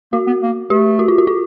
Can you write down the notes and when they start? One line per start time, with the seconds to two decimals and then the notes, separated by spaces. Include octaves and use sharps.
0.13 A#3 F#4
0.27 B3
0.42 A#3
0.70 A3 G4
0.99 F#4
1.08 F4
1.18 F#4
1.27 F4